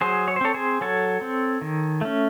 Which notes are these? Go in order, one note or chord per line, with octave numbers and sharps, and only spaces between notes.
F#3 G#4 C5
C#5
C5
C4 A4 C#5
G#4 C5
F#3 A4 C#5
C4
D#3
A3 C#4